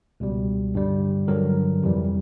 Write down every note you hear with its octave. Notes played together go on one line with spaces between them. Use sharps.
C#2 B2 G3
G2 D3 G3
G2 D3 F#3 A#4
F2 C3 E3 G3